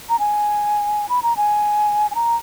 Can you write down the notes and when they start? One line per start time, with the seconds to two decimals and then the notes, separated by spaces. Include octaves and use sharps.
0.09 A#5
0.20 G#5
1.09 B5
1.23 A#5
1.37 G#5
2.11 G#5
2.15 A#5